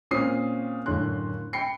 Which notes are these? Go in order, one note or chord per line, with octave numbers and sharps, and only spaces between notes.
A#2 C4 C#4 D#6 C7
F#1 A2 D3 C#5 C6 F#6
G5 B5 C7 C#7